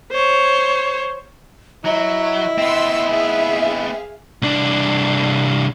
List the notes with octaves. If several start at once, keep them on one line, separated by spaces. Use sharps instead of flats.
C5 C#5
F#3 E4 D#5
B3 C4 C6 E6
G#4 E5 F5
C2 D4